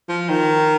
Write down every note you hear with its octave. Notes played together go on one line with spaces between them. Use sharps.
F3
D#3